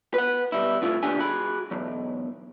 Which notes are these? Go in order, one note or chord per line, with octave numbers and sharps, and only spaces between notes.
B4 F#5
B2 G3 E4
A2 C3 E4 F4
D#2 B2 D4 G4 G#5
F#4 G#4 B5
B1 E2